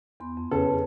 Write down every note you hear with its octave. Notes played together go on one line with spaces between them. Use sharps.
E2 B3 C6
F2
C#3 E4 A4 B4 C#5